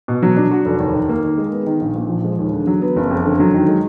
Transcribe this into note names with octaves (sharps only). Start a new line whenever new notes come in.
B2
F#3
D4
F#4
F1
D#2
D#3
A#3
D#3
G#3
B3
D#3
A#1
A#2
F3
G#3
D#2
D3
F#3
B3
F#1
F2
D3
F#3
D#3
G#3